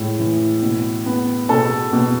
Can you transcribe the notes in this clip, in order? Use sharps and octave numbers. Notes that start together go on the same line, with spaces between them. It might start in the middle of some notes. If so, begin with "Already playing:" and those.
Already playing: A2 G#3
E3
B2
B3
B2 A4 A5
B2